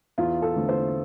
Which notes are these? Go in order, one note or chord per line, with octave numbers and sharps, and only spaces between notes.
E2 F4
A4
D3 A3 C4
C5